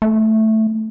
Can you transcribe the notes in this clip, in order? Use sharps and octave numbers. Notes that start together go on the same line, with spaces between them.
A3